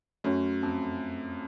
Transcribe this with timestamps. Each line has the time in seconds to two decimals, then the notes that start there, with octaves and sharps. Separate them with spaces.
0.24 F#2 A3 C#4 F#4
0.63 F2